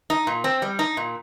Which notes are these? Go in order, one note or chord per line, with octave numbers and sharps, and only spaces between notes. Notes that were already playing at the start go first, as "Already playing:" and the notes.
D#4
A#2
C4
G3
D#4
A#2